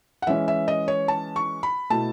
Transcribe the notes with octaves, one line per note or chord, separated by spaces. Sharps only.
F#5
E3 G#3 C#4 E5
E5
D#5
C#5
A5
C#6
B5
B2 A3 E4 A5